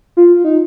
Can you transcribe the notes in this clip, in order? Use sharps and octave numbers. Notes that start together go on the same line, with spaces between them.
F4
D#4